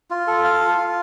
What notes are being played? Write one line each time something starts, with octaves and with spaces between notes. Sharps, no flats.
F4
A4
F5
F4
F4